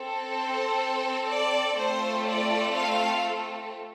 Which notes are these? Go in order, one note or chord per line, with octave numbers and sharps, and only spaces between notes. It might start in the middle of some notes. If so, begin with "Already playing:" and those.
Already playing: C4 A4
C5
D5
A3 C4 F4 A4 C5
D5
F5